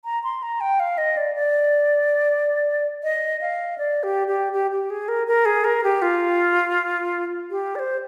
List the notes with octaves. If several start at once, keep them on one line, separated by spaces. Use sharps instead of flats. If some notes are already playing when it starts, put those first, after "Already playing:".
A#5
C6
A#5
G5
F5
D#5
D5
D5
D#5
F5
D5
G4
G4
G4
G4
G#4
A#4
A#4
G#4
A#4
G4
F4
G4
D5
C5